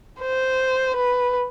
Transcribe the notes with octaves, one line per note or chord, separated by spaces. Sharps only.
C5
B4